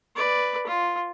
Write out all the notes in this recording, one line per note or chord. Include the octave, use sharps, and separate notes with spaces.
B4 D5
F4